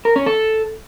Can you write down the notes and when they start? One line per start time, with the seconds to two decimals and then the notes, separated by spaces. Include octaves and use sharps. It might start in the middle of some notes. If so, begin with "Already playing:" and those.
0.05 A#4
0.16 C#4
0.26 A4